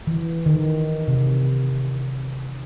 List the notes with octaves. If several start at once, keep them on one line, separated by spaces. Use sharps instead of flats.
E3
D#3
C3